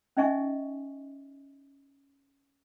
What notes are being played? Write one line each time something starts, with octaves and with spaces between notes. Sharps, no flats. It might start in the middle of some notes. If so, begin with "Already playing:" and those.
C#4 D#4 D#5 E5 G#5 C#6